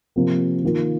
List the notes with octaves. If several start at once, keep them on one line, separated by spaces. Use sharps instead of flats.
C3 F3 A#3 F4
D#3 A#3 F4